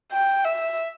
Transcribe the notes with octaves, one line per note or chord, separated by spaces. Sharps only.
G5
E5